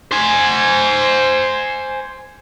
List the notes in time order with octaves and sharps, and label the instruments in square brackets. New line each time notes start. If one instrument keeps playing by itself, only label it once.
[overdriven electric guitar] C5 G#5